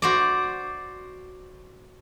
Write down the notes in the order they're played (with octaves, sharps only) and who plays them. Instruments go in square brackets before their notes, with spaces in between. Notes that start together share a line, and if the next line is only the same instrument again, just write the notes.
[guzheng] F#4 C5 D5